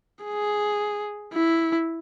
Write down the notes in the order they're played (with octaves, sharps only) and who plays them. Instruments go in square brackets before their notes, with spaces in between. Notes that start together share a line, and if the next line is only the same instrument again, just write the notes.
[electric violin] G#4
E4